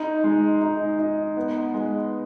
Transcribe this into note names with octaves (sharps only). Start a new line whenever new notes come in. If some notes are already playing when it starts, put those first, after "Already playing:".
Already playing: D#4
G#3
D#4
D#4
B3
G#3